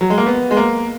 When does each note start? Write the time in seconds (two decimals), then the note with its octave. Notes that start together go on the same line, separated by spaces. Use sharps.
0.01 F#3
0.10 G#3
0.18 A#3
0.26 B3
0.51 G#3
0.57 A#3